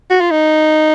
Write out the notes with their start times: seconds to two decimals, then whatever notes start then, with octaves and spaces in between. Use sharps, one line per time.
0.10 F#4
0.21 F4
0.31 D#4